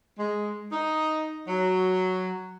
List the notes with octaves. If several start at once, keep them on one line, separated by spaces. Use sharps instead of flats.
G#3
D#4
F#3